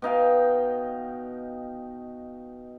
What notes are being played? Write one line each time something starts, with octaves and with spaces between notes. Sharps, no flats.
B2 D#4 F5 G5